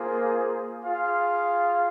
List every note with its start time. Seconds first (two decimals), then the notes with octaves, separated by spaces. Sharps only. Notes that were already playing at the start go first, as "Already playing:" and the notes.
Already playing: A#3 F4 G#4 C5
0.84 F4 G#4 F5